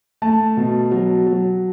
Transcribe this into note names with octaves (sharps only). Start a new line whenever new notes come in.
A3 A5
B2
F#3
F#3